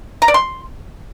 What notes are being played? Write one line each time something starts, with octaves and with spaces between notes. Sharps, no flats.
A#5
D5
C6